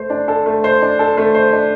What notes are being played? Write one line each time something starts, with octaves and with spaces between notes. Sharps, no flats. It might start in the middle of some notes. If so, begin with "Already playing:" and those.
Already playing: A3 A4 C5
D4
A4
A3
C5
D4
A4
A3
C5
D4